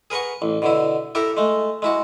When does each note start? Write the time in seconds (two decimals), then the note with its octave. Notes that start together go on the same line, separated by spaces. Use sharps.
0.10 G#4 A#4 B4 F#5 C#6
0.42 A1
0.62 B2 D3 E4
1.15 E4 G4 A4 A#4
1.37 G#3 A3
1.82 G#3 E4 F#4